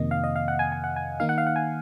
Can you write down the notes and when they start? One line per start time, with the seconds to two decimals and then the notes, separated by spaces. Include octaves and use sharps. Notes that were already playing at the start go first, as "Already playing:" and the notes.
Already playing: F2 C3 D#3 A#3 D#5
0.11 F5
0.24 D#5
0.36 F5
0.48 F#5
0.59 G#5
0.72 G#5
0.84 F#5
0.96 G#5
1.20 D#3 A#3 D#4 F5
1.29 F#5
1.38 F5
1.47 F#5
1.56 G#5